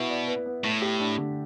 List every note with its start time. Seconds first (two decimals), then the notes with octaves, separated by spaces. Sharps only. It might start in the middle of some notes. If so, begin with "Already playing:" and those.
Already playing: B2 B3 E4
0.10 D5
0.28 B4
0.46 B3
0.64 A2 A3
0.82 G4
0.99 D4
1.17 D3